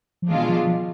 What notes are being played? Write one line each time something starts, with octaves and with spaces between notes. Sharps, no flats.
F3
B2 E3 G#3 D4 F4
F3
F3